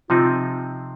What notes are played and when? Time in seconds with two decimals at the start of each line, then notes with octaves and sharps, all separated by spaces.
0.10 C3 F3 C4 D#4 F4